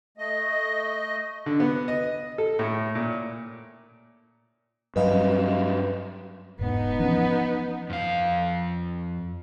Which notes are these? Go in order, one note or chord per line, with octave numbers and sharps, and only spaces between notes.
A3 D#5
D3
B3
D#5
A4
A2
A#2
G2 F#3 B4 D#5 F5
E1 G#2 B3 D#4
E3 F3 C#4
F2 F5